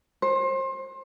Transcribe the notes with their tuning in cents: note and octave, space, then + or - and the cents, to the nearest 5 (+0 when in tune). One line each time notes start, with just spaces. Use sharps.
C5 +30